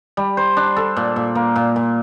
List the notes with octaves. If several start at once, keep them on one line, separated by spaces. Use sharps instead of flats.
G3
C5
D4
A4
A#2
A#2
A#3
A#2
A#2